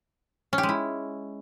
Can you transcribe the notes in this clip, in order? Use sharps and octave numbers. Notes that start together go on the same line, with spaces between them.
C#4
G4
G#3
E4